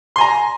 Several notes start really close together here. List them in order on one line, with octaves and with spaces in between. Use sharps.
C6 G#5 A#5